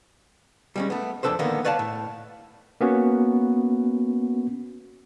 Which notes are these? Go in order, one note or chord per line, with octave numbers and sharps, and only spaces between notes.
G3 G#3 C#4
A3 B3
F2 D4 A4 B4 C5
D3 D#3 A#3 B3
B4 C#5 D5 F5 A5
A2
A#3 B3 C#4 F#4